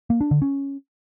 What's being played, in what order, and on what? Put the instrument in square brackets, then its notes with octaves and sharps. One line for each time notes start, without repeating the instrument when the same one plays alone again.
[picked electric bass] A#3
D4
D3
C#4